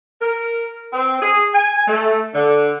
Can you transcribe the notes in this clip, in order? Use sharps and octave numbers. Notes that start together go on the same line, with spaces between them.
A#4
C4
G#4
G#5
A3
D3